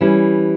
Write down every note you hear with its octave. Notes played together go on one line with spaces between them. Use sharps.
E3 G3 C#4 E4